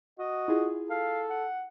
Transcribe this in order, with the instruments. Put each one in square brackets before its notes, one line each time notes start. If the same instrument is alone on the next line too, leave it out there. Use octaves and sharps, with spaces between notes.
[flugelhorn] F#4 [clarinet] D#5
[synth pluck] E4 F4 G#4
[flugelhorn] A4 [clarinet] F5
[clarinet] F#5